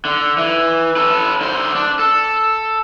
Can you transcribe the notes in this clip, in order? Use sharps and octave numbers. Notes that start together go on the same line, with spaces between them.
D3
E3
A4 B4
D3 C5
D4
A4